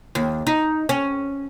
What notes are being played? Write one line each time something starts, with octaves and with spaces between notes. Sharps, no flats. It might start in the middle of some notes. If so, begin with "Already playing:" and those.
D#2
D#4
C#4